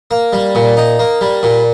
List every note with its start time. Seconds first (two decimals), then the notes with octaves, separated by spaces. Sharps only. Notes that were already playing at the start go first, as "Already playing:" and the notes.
0.11 A#3
0.33 G3
0.55 A#2
0.77 D#4
0.99 A#3
1.21 G3
1.43 A#2